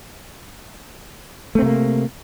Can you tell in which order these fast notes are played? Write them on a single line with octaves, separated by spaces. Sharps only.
A3 C4 C3 A#3